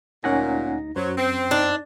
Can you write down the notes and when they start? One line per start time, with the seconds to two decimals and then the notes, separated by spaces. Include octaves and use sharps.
0.24 D2 A#2 C#4 D#4 F#5 G#5 A#6
0.96 F#2 F#3 C5
1.17 C4
1.51 D4 D#4